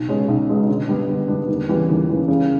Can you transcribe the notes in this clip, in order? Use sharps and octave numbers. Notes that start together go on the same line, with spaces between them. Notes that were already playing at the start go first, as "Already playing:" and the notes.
Already playing: B1
B2 G#3 C#4
B1
B2 G#3 C#4
D3
G3 B3 D4
D3
G3 B3 D4
D#2
C#3 E3 G3
D#2
C#3 E3 G3
C#3